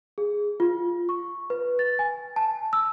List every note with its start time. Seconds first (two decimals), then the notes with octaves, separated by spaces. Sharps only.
0.18 G#4
0.60 F4
1.09 C#6
1.50 B4
1.79 A6
1.99 G#5
2.36 A5
2.73 E6